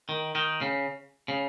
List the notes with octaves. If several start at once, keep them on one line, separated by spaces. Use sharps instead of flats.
D#3
D#3
C#3
C#3